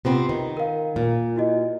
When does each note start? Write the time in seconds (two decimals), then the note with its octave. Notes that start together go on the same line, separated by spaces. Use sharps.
0.05 C3 B3 C4 F4
0.29 D#3
0.57 A#4 F5
0.96 A#2
1.36 E4 F#4 D#5